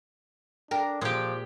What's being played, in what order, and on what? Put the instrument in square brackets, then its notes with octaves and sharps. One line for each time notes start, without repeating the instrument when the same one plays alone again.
[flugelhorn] D4 [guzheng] A#4 [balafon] G5
[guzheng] A#2 [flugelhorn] F3 [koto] G#3 G4